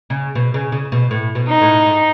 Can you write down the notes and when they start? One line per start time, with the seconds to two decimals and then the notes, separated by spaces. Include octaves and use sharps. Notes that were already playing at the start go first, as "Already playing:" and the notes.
0.10 C#3
0.35 B2
0.54 C#3
0.72 C#3
0.92 B2
1.11 A2
1.35 B2
1.48 D#4
1.61 A2
1.86 G#2